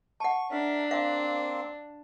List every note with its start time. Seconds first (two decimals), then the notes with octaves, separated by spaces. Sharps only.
0.20 F#5 A5 C#6
0.51 D4 A#4 E5
0.91 A#3 C4 F5